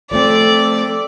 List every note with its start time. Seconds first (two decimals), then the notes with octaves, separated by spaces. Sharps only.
0.11 F3 A3 C4 A4 D5